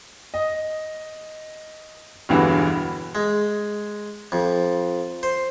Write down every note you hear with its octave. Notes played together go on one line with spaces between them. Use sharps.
D#5
E1 B1 G2 D3 E3 F#4
G#3
F2
C5